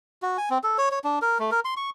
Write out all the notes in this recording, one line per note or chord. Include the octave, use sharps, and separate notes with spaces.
F#4
G#5
C4
A4
C#5
C#5
D4
A#4
A3
A#4
C6
C#6